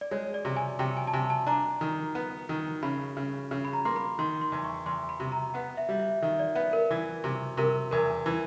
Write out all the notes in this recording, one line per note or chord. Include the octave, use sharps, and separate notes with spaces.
D5
G#3 C#5
D5
C3
G#5
C3 G5
G#5
A5
C3 G#5
A5
D4 A#5
D#3
B3
D#3
C#3 B5
C#3
C#3
B5
A#5
A#3 C6
B5
D#3 C6
C6
E2
C#6
E2 C6
B5
C3
A#5
B3 F#5
E5
G3
E5
D#3 E5
D5
B3 E5
A#4
E3
C3
C3 A#4
E2 A#4
E3